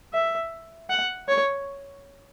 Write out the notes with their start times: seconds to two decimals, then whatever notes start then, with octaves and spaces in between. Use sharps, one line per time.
0.13 E5
0.90 F#5
1.29 C#5